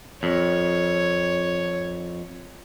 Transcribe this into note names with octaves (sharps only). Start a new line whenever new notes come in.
F2 C#5